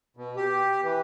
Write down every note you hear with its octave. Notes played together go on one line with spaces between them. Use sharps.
B2
G4
E3